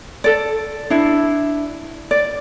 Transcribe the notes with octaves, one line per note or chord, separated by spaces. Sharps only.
A4 D5
D4 E4
D5